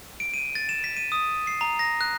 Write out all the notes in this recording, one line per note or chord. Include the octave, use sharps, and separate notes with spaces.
D7
D#7
A6
E7
B6
D#7
D#6
C7
A#5
A#6
F#6